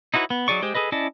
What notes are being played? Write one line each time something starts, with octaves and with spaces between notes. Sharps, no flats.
D#4 E4 F#4 B4 C#5
B3
F#3 D#4 G#4 D5 C#6
G#3 G4 C5
G#4 A4 B4 D#5
C#4 E4 D5 D#5 A5